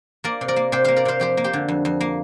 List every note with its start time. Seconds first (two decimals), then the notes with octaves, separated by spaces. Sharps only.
0.24 A#3 A#4 D5
0.41 C3
0.48 A#4 D5
0.56 A#3
0.72 C3 G4 C5
0.84 A#3 C5 F5
0.96 A#4 D5
1.05 C3 C5 F5
1.20 F2 G4 C5
1.37 A#3
1.44 G4 C5
1.53 D3
1.68 F2
1.85 F2
2.01 A#3